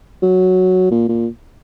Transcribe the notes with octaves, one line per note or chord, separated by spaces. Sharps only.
F#3
A#2
A#2